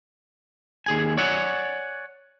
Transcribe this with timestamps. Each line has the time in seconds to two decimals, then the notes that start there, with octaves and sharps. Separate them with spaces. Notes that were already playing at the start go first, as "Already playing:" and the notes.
0.86 D#2 G#4 G#5
1.17 C#5 D5 F#5 G#5